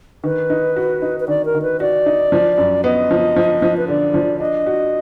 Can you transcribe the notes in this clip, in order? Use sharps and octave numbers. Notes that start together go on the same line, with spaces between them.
D#3 B4
D#4
F#4
D#4
B4
D#3 D5
A#4
D#3
B4
F#4 D5
D#4
F3
F#2
B3 D#5
F3
F3
F3
B4
D3 D5
F3
D4 D#5
F#4